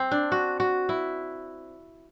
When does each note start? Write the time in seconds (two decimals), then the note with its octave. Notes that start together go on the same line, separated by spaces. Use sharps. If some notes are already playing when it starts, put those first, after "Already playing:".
Already playing: C4
0.11 D4
0.32 F#4
0.60 F#4
0.89 E4